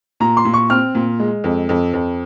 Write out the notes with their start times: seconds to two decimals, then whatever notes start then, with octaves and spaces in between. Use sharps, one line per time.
0.20 A#2 A#5
0.37 C6
0.45 A#2
0.54 C#6
0.70 C4 F6
0.95 A#2
1.19 G#3
1.44 F2
1.69 F2
1.94 F2